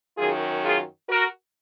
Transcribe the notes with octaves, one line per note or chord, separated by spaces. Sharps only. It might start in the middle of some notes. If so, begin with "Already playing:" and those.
F#2 D#3 F#3 F4 G#4
F4 G#4
F#4 A#4